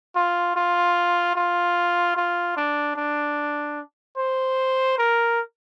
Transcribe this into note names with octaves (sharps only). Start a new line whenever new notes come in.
F4
F4
F4
F4
D4
D4
C5
A#4